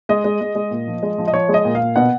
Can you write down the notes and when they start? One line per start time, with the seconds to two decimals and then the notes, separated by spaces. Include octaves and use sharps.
0.09 G#3 D#5
0.24 G#3
0.41 G#3
0.55 G#3
0.71 A#2
0.88 F3
1.03 G#3
1.18 F3
1.28 D#5
1.33 F3 C#5
1.49 G#3
1.54 D#5
1.65 A#2
1.75 F5
1.80 A#2
1.96 B2 F#5